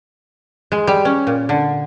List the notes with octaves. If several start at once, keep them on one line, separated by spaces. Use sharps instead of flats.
G#3
G3
C#4
A#2
D3